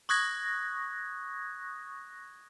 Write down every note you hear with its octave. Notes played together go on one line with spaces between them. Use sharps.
C#6 D#6 F#6 G#6 A#6